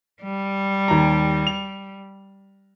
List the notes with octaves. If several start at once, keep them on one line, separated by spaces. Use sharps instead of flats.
G3
D#2 A#5
F7